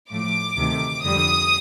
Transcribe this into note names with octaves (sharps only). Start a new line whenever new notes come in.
A2 F3 A3 D6
D2 C3 D#3 A3
F2 D3 G3 D#6